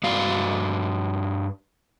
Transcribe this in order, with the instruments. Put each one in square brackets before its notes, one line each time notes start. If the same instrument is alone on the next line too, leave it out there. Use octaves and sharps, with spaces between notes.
[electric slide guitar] G2 F#4 D5 F5